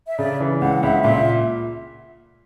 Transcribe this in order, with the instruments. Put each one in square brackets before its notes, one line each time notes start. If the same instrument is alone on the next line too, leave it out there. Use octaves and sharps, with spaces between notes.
[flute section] E5
[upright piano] C#3 [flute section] D5
[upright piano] E3
[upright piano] C#2 [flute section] F#5
[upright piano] C#2 [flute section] E5
[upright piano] A#2 [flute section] E5